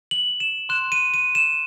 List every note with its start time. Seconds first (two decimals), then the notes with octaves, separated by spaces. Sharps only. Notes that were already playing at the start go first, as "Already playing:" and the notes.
0.11 F#7
0.40 E7
0.69 C6 F#6 E7
0.92 D#7
1.14 D#7
1.35 E7